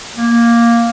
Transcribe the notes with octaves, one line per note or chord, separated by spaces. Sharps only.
A#3